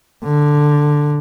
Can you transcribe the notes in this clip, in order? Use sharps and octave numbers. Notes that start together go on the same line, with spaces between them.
D3